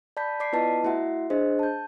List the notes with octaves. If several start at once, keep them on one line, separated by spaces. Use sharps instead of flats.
D5 A5 B5 G6 B6
D5 D6 B6 C7
B3 E4 F4 B4 D#5 A5
A3 E4 F#4 E5 F#5
D4 G#4 C5 D#5
A5 G6